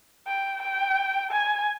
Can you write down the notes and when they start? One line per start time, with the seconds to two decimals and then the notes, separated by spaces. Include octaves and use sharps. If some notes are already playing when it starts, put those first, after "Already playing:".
0.27 G5
0.62 G5
1.31 G#5